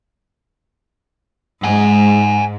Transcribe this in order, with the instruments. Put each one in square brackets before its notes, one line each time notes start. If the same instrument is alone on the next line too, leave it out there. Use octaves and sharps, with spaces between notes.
[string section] G#2 [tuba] G#3 [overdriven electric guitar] F#5 G#5